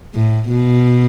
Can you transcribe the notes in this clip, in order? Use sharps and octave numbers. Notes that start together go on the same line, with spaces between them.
A2
B2